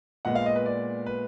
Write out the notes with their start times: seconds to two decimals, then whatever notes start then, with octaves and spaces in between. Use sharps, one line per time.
0.25 A#2 G#3 B3 F#5
0.35 F5
0.46 D#5
0.56 B4
0.66 D5
1.06 B4